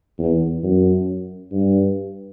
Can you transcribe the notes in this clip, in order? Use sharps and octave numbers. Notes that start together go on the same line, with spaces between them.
E2
F#2
G2